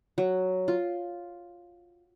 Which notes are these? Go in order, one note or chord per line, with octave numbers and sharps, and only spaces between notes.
F#3
F4